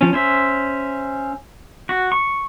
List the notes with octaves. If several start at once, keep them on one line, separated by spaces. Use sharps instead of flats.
F3 C#4
C#4 C5 E5
F#4
C#6